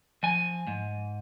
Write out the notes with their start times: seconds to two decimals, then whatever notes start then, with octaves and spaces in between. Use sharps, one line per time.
0.23 F3 G#5
0.67 G#2